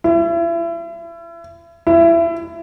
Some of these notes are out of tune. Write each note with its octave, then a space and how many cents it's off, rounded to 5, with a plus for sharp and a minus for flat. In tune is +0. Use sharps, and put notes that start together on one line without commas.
E4 +35
E4 +25